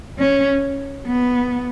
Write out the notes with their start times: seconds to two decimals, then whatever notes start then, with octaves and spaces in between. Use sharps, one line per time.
0.19 C#4
1.07 B3